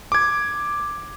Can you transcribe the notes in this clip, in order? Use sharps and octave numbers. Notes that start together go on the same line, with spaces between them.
D6 G#6